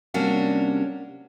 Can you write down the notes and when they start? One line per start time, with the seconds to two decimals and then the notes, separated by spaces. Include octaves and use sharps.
0.14 C3 G3 A#3 C#4 D4 F#4